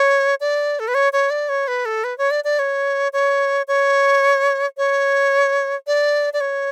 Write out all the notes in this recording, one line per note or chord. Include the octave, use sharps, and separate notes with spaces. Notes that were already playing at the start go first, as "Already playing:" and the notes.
Already playing: C#5
D5
A4
B4
C#5
C#5
D5
C#5
B4
A4
B4
C#5
D5
D5
C#5
C#5
C#5
C#5
D5
D5
C#5